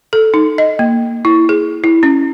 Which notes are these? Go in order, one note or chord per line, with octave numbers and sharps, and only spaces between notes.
A4
D#4
D#5
A#3
E4
G#4
E4
C#4